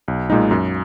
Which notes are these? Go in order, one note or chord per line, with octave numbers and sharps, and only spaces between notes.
B1
A#2 G#3 D#4
F#2